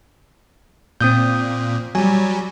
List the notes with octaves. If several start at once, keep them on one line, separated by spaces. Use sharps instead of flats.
A#2 C4 D#6 G6
F#3 G3 G#5